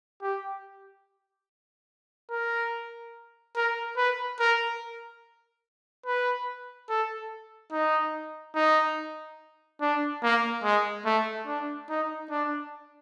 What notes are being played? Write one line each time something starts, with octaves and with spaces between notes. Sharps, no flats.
G4
A#4
A#4
B4
A#4
B4
A4
D#4
D#4
D4
A#3
G#3
A3
D4
D#4
D4